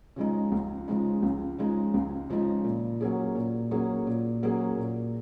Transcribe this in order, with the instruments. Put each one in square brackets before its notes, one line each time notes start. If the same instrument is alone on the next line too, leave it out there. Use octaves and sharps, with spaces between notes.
[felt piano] C#3 F3 G#3 D#4
C#2
C#3 F3 G#3 D#4
C#2
C#3 F3 G#3 D#4
C#2
C#3 F3 G#3 D#4
A#2
F#3 A#3 C#4 G#4
A#2
F#3 A#3 C#4 G#4
A#2
F#3 A#3 C#4 G#4
A#2